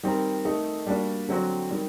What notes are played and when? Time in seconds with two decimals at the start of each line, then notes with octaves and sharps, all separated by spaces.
0.03 D#3 G3 C4 G4 A#4
0.45 D#3 A3 D#4 A4
0.86 G3 A#3 D4 F#4
1.29 D3 F#3 C4 F#4
1.71 D#3 G3